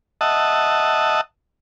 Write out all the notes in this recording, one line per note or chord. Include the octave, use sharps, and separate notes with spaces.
D#5 E5 F#5 A5